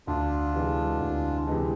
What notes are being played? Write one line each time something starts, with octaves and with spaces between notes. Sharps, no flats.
D2 D4 F4
C3 E3 G#3
D2
C3 E3 G#3